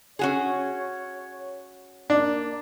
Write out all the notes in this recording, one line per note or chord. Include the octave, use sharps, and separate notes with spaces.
C#4 F#4 G#4 C#5
A#3 D4